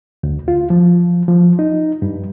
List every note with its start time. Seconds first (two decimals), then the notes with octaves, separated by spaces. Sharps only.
0.23 D2
0.48 F4
0.70 F3
1.28 F3
1.59 D#4
2.02 G2